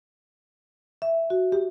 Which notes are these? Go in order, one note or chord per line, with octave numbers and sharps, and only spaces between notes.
E5
F#4
G4